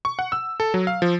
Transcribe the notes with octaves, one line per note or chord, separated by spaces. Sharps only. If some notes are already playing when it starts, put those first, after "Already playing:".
C#6
F#5
E6
A4
F#3
F5
F3